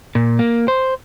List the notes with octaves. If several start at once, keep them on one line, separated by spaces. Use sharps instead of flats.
A#2
A#3
C5